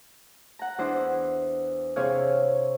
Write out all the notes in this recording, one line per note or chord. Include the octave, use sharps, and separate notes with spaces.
F#5 A#5
E2 D4 E4 C5
C3 C4 E4 G#4 C#5 F5